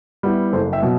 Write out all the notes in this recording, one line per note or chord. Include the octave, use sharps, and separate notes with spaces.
G3 B3 E4
F#1 A4 C5
E5 G5
B2 F#3